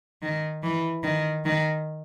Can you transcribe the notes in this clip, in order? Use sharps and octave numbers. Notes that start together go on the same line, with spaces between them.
D#3
E3
D#3
D#3